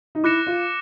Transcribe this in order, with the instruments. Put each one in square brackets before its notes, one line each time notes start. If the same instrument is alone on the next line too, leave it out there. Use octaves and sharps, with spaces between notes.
[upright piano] D#4
[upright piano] E4 [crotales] D6 F#6 A#6 C#7 E7
[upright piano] F4